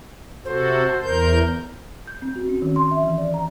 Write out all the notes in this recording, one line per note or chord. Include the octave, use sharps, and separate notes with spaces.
C3 F#4 A4 C5
E2 A#4 G6
G6
C4
F#4
C#4
D#3
C6
E5
E3
D5
A#5